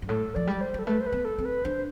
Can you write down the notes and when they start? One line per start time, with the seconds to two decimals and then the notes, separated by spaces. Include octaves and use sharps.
0.02 G2
0.08 A2 A4
0.35 F3 D5
0.47 G3
0.61 C5
0.74 G3 A4
0.86 A3 B4
1.00 C5
1.06 B4
1.13 B3
1.25 A4
1.38 C4
1.45 B4
1.64 D4 C5